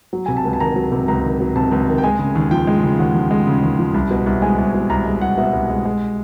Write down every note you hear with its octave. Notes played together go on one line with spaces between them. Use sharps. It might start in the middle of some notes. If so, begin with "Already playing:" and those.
F#3
C3 G#5
A5
C#2
A5
D#3 A#5
F#3
C3
C#2 A#5
D#3
F#3
C3 A5
C#2
D#3
G5
G#3 G#5
C#3
D#2
F3 G5
G#3
C#3
D#2 F#5
F3
G#3
C#3
D#2
F3
C2
B2
C2
G#3 G#5
C2
B2
C2 A#5
G#3
C2 F#5
B2 E5
C2
G#3
G#3